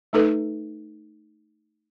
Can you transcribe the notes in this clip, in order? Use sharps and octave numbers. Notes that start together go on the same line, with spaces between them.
A3 D#4 A4 B4